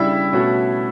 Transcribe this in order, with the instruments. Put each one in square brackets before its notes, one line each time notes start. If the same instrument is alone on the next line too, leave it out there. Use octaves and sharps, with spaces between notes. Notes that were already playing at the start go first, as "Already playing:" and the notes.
Already playing: [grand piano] C#3 G3 D4 G4 [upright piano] E4 E5
[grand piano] B2 A3 C#4 F#4 C#5